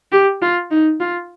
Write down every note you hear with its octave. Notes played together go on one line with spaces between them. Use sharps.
G4
F4
D#4
F4